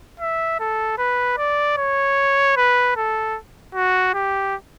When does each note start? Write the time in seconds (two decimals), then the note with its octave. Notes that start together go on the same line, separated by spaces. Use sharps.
0.20 E5
0.60 A4
0.98 B4
1.38 D5
1.77 C#5
2.57 B4
2.96 A4
3.75 F#4
4.14 G4